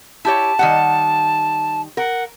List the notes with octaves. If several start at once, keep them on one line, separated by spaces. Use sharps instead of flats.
E4 G4 C#5 A5
D#3 G3 F#5
A#4 F#5